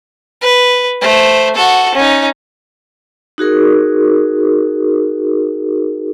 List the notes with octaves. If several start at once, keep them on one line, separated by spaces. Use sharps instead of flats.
B4
A3 C5
F#4 A4
C#4 D#4
D#4 F#4 G#4 A#4